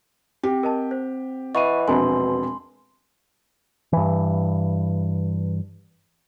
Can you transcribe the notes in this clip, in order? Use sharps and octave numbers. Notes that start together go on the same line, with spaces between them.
C4 G4
A#4 D#5 A5
C5
E3 D#5 F#5 B5 C#6 D#7
E1 A#1 B2 C4 G#5 A5 B5 C6
G2 E3